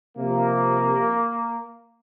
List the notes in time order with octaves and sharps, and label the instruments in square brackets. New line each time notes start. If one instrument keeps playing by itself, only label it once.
[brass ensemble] C3 F3 A#3